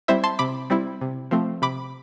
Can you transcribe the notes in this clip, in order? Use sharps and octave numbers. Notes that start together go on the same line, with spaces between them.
G3 C4 E4 C5 E5
A5 C6
C3 B5 D6
G3 C4 E4
C3
F3 A3 C4
C3 B5 D6